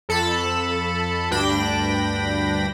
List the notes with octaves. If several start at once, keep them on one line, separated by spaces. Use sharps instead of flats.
F2 A4 A5 B5
D2 G2 D4 G5 B5 A#6